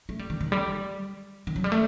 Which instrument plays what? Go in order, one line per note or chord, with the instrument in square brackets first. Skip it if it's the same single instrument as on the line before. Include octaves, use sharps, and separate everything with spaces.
[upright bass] A3
G3
D#3
D#3
G3
D#3
F#3
G3
A3